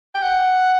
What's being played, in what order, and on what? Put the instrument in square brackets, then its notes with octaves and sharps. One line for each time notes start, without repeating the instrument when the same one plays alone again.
[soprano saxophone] G5
F#5